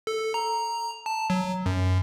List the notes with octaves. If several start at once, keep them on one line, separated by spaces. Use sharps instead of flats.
A4
A#5
A5
F#3
F#2